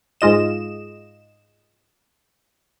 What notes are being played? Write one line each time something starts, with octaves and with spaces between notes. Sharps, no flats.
G#2 G#3 F4 D#5 E7